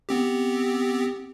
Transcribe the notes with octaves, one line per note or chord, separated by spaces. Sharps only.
B3 C4 G4